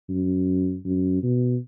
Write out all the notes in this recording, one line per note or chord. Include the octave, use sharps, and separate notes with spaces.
F#2
F#2
B2